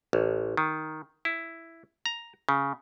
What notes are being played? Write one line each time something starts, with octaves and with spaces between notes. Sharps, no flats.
A1
D#3
E4
A#5
C#3